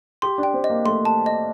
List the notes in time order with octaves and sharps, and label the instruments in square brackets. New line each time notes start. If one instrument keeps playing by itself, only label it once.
[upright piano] G4 [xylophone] C6
[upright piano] D4
[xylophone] G5
[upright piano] C4
[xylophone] D#5
[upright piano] A#3
[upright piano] A3 [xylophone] C6
[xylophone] A5
D#5